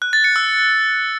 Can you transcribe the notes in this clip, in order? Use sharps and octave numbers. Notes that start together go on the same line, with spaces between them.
F#6
A6
C#7
E6